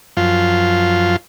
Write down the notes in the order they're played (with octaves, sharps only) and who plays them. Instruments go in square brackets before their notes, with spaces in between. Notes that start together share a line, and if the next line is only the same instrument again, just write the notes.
[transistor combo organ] F#2 F3 F4